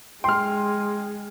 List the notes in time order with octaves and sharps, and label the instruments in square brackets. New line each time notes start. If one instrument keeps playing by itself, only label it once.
[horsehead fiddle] G#3 [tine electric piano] G5 [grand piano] C6 F6